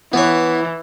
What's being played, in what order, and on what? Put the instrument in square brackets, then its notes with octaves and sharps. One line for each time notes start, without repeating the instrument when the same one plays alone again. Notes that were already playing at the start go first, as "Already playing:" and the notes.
[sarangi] E3 [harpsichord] B3 C#5